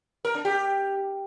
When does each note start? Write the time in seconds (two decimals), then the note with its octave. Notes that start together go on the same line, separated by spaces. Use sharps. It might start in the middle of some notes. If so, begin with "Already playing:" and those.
0.25 A#4
0.35 D4
0.45 G4